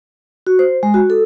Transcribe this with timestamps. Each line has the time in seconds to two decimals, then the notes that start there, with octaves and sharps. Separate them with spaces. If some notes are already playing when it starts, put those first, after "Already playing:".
0.47 F#4
0.59 C5
0.83 G#3
0.94 F#4
1.10 A4